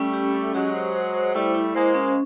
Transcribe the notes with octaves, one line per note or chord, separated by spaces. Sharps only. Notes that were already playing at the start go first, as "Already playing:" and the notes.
Already playing: G3 A3 C#4
G4
C#4
F#3 G#3 G4
C5
C5
C5
G3 A3 E4
E4
G#3 A#3 C5
C#4